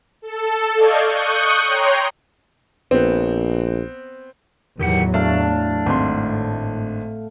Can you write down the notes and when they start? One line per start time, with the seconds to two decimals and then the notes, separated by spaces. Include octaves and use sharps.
0.22 A4
0.76 D5 D#5 F5 C#6 G6 G#6
1.06 C#6 D#6 F#6 G6 C#7
1.64 C#5 G5 A#5 C6
2.91 A#1 B3 C4
4.79 E2 A2 D#3 F#3 G4 F#5
5.14 A3 D4 F5 A5
5.86 G#1 A2 C6